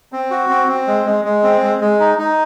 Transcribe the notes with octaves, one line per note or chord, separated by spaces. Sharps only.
C4
F#4
C4
C4
G#3
G#3
G#3
C4
G#3
G#3
D#4
D#4